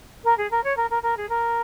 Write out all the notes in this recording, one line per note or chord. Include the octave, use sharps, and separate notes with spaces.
A#4
G#4
A#4
C#5
A#4
A#4
A#4
G#4
A#4